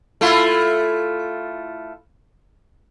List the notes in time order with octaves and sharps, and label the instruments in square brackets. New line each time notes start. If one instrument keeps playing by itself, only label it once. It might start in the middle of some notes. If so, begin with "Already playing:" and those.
[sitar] A3 E4 F4